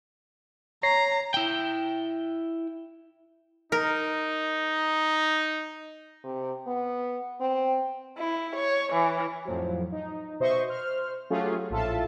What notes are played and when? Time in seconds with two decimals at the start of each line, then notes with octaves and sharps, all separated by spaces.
0.83 C#5 A#5 A#6 C7
1.34 E4 G5
3.72 D#4 A#4
6.24 C3
6.66 B3
7.40 C4
8.18 E4
8.56 C#5
8.93 E3
9.45 F2 A2 F3 F#3
9.92 D#4
10.40 B2 C5 D#5 E5 C6 C#6
10.68 C5 F6
11.30 F#3 A3 C#4 F4 G4 G#4
11.70 A#1 A2 F4 A4 E5 A5